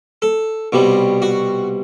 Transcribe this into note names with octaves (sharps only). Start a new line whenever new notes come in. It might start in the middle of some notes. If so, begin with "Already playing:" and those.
A4
C2 B2 G3
F#4